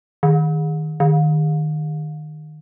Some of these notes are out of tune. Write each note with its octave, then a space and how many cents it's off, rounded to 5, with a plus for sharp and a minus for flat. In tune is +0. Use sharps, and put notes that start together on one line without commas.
D#3 +0
D#3 -20